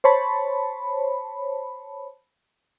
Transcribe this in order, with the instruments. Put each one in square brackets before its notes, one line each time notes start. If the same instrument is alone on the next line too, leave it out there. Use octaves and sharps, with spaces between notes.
[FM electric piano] C5 C#5 A5 B5